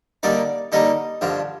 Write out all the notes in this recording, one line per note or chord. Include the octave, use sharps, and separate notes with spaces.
D3 G3 A#3 D#4 D5
D3 G3 A#3 D#4 D#5
G2 D3 F3